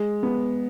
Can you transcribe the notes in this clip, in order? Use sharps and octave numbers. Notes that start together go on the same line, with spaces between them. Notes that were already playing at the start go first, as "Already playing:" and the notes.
Already playing: G#3
B3